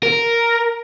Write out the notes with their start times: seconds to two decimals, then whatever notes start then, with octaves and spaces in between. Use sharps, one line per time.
0.03 A#4